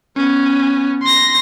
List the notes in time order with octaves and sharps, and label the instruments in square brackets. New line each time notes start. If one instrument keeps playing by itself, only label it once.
[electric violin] B3 C#4
C6 A#6